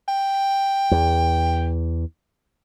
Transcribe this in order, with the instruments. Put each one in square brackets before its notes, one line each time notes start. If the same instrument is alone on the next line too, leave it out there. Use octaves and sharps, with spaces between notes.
[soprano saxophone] G5
[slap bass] E2